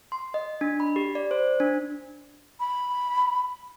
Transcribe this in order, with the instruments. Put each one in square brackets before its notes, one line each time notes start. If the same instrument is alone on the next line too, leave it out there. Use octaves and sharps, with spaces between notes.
[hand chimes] C6
D#5
D4
B5
G4
D5
C5
D4
[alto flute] B5